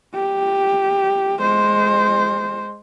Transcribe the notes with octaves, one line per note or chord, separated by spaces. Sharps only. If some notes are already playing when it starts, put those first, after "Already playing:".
G4
G#3 C5